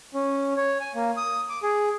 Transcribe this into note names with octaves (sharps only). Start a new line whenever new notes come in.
C#4
C#5
G#5
A#3
D#6
D6
G#4